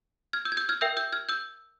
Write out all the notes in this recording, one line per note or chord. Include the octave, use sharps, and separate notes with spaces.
F6 G#6
E6 G6
G#6
E6 G6
F6 G#6
A#4 E5 G5 E6 G6
E6 G6
F6 G#6
E6 G6